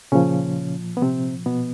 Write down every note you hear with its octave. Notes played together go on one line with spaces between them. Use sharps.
A#2 C#3 F3 C#4
B3
C3 C4
B2 B3